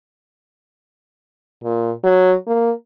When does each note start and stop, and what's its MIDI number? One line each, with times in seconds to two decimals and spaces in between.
1.64 1.91 46
2.04 2.35 54
2.48 2.72 58